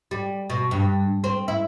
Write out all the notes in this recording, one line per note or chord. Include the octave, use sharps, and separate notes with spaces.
G3
B2
G2
C4
E4